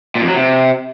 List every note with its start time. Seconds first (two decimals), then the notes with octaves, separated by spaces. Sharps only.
0.15 A#2
0.22 F2
0.28 F#3
0.34 C3